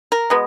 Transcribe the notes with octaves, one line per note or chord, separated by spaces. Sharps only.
A#4
B2 G#3 B3